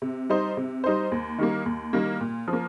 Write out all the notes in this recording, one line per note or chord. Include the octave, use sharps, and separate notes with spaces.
C3
G3 D#4 C5
C3
G3 D#4 C5
D#2
D#3 G3 A#3
D#2
D#3 G3 A#3
A#2
F3
A#3